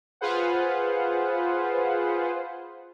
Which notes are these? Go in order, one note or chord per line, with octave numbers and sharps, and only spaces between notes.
F4 G#4 B4 C5 F#5